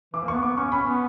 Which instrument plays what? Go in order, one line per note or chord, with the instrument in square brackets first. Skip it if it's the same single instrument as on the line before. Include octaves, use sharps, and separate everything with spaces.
[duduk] E3 [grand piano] D6
[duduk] A#3
[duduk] B3 [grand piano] C#6
[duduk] B3 [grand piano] D6
[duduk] C#4 [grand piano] C#6
[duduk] C#4 [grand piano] B5
[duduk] B3